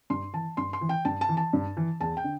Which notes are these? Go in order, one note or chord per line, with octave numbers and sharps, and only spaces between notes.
G2 C6
E3 A5
G2 C6
C6
E3
G5
G2 A5
A5
E3
A5
G2
E3
E2 A5
G5
D3